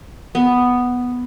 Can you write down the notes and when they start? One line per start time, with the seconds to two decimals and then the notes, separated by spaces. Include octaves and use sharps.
0.35 B3